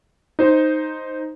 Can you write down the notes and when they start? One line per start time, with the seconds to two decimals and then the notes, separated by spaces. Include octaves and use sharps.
0.39 D#4 C5